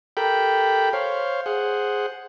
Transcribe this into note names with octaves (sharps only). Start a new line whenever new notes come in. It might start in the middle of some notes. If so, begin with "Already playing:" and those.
G4 A4 A#4 G5 B5
C5 C#5 F5
G#4 C5 F#5